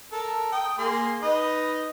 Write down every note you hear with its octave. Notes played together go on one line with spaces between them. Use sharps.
A4 A#4
G5 D#6
A#3 G#4 C6
D#4 B4 D#5